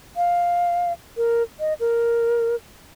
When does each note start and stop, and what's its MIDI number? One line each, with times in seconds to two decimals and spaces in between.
0.17 0.93 77
1.17 1.43 70
1.60 1.74 75
1.80 2.55 70